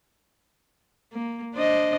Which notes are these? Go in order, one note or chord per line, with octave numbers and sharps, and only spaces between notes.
A#3
D4 C5 D#5